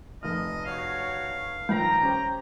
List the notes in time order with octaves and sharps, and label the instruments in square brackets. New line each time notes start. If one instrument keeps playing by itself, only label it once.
[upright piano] F1 A3 F6 [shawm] D#5
[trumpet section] F#4 C#5 [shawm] F5
[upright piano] G2 D#3 F3 [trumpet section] G5 A#5
[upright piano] C#4 G4 C5